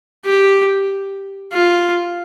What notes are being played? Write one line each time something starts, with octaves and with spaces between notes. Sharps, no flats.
G4
F4